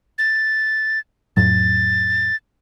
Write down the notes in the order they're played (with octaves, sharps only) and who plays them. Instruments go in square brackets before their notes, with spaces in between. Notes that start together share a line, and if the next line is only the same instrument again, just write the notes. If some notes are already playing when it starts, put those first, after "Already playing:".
[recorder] A6
[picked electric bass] F2 A2 F#3 [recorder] A6